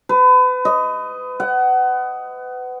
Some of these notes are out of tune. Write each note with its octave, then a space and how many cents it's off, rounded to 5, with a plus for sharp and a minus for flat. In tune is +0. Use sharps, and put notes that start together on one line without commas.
B4 +35
D#5 +5
F#5 +25